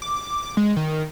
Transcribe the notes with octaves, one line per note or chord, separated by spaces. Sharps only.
D6
G#3
D#3